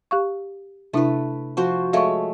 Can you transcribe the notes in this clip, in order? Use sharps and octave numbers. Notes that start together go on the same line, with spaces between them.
G4 F5 C#6
C3 A3 D4 E4 B4
F3 F#4 C5
G#3 A3 C#5 F5 C#6